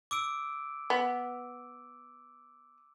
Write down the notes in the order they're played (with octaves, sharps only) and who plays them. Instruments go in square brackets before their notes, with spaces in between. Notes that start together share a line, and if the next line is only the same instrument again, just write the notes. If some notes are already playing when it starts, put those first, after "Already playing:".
[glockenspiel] D6 E6 D7
[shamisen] B3